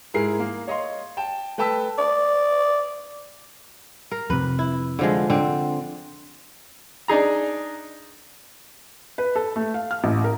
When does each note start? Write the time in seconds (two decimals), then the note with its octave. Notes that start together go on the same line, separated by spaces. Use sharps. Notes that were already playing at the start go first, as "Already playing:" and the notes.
0.14 G#2 E4 G#4 A#4 C7
0.40 A#3
0.68 C#5 D#5 F5 C6
1.17 G5 A5 E7
1.58 A3 B4 G5 A5 E6 B6
1.98 D5
4.11 A#4
4.30 F2 C3 B4
4.59 E4
4.99 D3 F3 G#3
5.30 D3 C4
7.08 D4 D#4 G#4 A#5
9.18 B4
9.36 A4
9.56 A3
9.74 F5
9.91 F6
10.04 A1
10.24 A#4